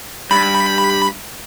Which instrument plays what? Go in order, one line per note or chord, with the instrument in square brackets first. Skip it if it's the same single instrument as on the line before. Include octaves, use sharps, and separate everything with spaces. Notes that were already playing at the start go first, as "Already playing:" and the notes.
[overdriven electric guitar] G2 [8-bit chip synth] B5